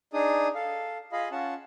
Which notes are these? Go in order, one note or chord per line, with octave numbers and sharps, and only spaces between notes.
D4 D#4 G#4 D#6
A4 F5
F4 G#4 D#5 F5 B5
C#4 F4 F#5 A5